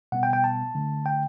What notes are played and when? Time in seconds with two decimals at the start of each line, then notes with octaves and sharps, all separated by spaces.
0.12 B2 G3 B3 F#5
0.23 G5
0.33 G5
0.44 A5
0.75 D3 A3
1.06 G5